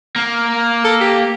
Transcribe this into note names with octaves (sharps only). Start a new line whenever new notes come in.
A#3
A4
G4